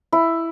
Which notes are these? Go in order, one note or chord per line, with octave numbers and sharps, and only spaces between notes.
E4